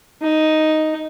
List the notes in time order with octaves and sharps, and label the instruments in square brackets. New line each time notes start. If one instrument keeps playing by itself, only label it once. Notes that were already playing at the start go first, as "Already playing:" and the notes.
[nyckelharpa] D#4